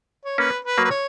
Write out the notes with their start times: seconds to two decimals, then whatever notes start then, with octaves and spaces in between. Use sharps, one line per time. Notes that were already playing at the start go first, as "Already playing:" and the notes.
0.25 C#5
0.38 A#3 C#4 B4
0.65 B4
0.78 F#3 A#3
0.85 B4
0.90 C#5